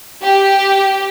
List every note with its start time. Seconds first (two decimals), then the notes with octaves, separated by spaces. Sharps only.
0.24 G4